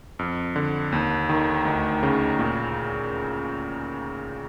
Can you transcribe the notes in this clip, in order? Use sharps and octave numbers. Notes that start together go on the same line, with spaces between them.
F2
D3
D#2
D#3
D2
C#3
A#2